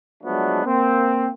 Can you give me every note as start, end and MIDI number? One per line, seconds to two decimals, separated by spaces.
0.24 0.62 53
0.24 0.62 54
0.24 0.62 56
0.24 0.62 57
0.24 0.62 59
0.24 0.62 62
0.65 1.30 58
0.65 1.30 60